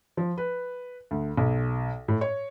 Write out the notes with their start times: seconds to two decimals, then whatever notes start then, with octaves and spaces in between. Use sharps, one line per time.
0.17 F3
0.38 B4
1.11 D2
1.38 B1
2.08 A2
2.21 C#5